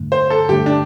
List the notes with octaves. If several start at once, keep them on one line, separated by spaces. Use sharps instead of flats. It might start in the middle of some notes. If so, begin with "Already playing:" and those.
Already playing: G2 D3 A3
C5
A4
G2 D3 A3 G4
D4